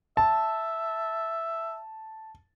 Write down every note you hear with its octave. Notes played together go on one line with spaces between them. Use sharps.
E5 A5